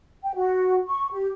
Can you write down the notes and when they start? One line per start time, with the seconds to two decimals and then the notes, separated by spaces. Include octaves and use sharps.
0.23 G5
0.35 F#4
0.86 C#6
1.12 G4